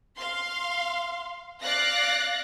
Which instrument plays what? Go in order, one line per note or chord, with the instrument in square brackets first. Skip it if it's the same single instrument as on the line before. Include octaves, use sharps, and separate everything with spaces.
[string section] F5 C6
D5 F5 F#6 A#6